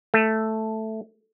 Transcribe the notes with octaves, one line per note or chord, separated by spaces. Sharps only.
A3